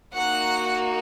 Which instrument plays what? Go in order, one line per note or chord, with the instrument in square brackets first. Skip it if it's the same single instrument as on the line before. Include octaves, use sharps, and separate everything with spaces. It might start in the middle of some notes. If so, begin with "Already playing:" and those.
[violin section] A#3 D#4 F#4 F#5